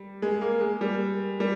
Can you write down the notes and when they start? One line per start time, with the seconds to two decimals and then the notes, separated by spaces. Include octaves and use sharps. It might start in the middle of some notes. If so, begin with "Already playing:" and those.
Already playing: G3
0.22 G#3
0.41 A#3
0.61 G#3
0.81 G3
1.40 G3